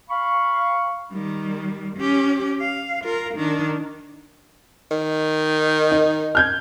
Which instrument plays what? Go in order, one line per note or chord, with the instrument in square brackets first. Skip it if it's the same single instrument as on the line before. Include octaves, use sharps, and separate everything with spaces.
[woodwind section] F5 B5 C#6
[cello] D#3 G3
C#4 G4
F5
F4 A#4
D#3 D4
[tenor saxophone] D#3
[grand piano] D#4
F6 G6 G#6